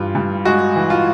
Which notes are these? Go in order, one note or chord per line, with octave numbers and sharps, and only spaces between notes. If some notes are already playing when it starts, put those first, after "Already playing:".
Already playing: G2 E3 F4
G2
G#3 F#4
E3
F4